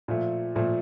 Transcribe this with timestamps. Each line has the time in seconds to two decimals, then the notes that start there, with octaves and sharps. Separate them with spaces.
0.08 A#2 F3 A3
0.55 A#2 F3 A3